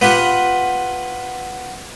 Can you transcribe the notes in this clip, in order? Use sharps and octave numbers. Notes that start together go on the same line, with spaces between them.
B3 F4 G4 F#5